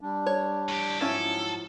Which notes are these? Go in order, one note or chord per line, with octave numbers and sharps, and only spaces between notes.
G3 D4
C#5
A2 G4
G#2 F3 F#3 C#4 E4 A4